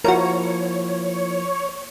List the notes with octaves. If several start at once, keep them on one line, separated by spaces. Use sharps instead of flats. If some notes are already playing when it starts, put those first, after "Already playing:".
F3 A#3 E4 F#4 A#4 C#5